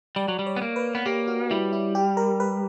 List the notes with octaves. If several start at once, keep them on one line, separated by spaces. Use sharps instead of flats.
G3 D5
F#3
G3
C#5
B3
A#3
B4
B3
A#3 G4
F#4
G3 E4
E4
G4
A#4
B4